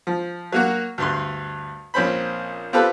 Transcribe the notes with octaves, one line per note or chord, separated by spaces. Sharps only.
F3
F#3 A#3 F#4
D2 G2 C6
A#1 C4 C#4 C5 B5
C4 F4 G4 A4 B4